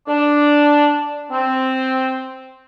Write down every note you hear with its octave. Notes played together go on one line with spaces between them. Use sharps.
D4
C4